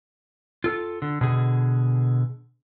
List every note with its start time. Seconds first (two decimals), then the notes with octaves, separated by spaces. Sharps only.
0.64 F4 A4
1.02 D3
1.21 B2 D3 G#4